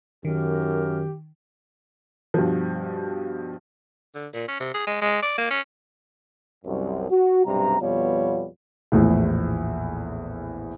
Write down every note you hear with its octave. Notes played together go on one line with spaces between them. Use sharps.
F#2 D#3 G4 A#4
G2 B2 F3
D3
A#2
C#4
C3
G#4
G#3
G#3
D5
A#3
C#4
C2 F#2
F#4
B1 G2 C3 G3 A#5
F2 B2 G3 B3 F4 C#5
A#1 E2 A2